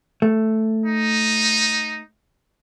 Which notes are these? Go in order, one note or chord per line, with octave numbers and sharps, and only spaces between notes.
A3
D#4